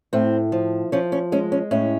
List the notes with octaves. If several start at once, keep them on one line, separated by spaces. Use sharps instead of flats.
A2 C4
F3
F3 C#4
C#4
G#3 C#4
C#4
A2 C#4